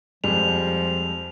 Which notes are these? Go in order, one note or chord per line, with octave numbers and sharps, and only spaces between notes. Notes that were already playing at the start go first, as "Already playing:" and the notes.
F2 F3 G3 G#3 F7